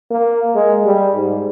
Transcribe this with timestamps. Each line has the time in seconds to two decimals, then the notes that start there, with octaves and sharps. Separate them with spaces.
0.11 A#3
0.55 G#3
0.85 G3
1.15 G#2